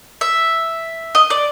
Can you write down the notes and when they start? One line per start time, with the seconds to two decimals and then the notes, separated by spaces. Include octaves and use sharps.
0.21 E5
1.15 D#5
1.30 D5